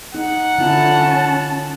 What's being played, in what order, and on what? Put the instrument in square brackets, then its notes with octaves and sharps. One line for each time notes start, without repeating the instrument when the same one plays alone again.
[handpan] D#4 [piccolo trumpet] F#5
[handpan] D3 E4 F4 [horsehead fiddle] C#4 A5